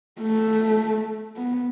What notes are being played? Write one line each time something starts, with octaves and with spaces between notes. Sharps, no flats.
A3
B3